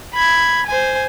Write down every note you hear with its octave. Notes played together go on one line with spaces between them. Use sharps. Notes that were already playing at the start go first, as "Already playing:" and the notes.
B5 G#6
C5 G#5